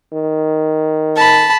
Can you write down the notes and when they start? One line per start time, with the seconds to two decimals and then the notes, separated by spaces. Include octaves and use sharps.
0.13 D#3
1.17 A5 B5